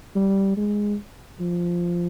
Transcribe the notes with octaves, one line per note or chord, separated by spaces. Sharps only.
G3
G#3
F3